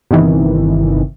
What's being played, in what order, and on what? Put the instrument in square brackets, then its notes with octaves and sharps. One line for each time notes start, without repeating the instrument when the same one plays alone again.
[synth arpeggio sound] G1 C3 D#3 E3